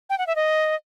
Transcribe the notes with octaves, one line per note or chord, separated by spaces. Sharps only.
G5
F#5
E5
D#5